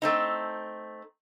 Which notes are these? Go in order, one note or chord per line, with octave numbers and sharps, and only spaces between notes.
A3 C4 D#4